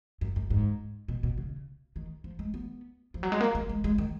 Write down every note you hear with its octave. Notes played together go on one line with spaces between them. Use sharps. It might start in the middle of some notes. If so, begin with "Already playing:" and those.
F#2
F#2
G#2
B2
B2
C#3
D#3
F3
G#3
B3
F3
F#3
G#3
A#3
A#3
G#3
G#3
D#3